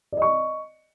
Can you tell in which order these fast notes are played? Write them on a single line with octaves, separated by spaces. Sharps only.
D5 D#5 C#6